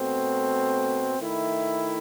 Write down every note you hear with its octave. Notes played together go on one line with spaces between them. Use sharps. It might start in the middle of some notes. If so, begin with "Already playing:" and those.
Already playing: B2 A3 C4
D#3 A3 E4